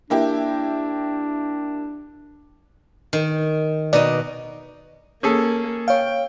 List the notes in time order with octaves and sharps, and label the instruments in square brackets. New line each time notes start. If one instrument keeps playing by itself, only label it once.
[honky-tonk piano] A#3 E4 G4 [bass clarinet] D4
[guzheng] D#3
[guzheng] B2 D#4 D#5 [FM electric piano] D5
[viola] A#3 [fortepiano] C#4 G#4 A4
[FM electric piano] C#5 F5 [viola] G5